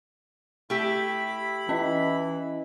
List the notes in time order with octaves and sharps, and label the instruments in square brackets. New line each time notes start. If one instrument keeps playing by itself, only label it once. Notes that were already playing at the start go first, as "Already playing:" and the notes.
[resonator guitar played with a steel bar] A3 G4 [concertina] E4 B5
[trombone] E3 [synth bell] C#4 D#5